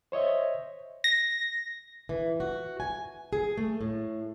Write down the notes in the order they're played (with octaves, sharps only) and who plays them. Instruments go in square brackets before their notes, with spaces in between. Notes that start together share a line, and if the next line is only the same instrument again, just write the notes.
[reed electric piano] C5 C#5 D#5 E5
[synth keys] A#6
[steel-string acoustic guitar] E3
F#4
G#5
G#4
A3
A2